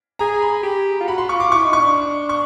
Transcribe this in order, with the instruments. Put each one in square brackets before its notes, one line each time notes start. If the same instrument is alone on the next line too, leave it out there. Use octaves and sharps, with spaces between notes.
[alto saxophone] G#4 [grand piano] A#5
[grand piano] B5
[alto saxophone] G4
F4
[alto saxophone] F#4 [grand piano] B5
[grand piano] C6
[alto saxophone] F4 [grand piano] C#6
[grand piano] D6
[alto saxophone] E4 [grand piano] C#6
[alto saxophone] D#4
[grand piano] C#6
[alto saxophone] D4
[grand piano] C#6